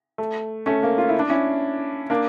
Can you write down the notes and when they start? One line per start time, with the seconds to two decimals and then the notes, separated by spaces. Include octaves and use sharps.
0.18 A3
0.66 A3 C#4
0.83 A#3
0.98 F4
1.09 E4
1.19 D4
1.30 C#4 E4
2.10 A#3 D4